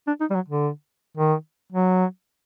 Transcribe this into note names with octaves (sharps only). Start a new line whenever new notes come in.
D4
D#4
G3
F#3
D3
D#3
F#3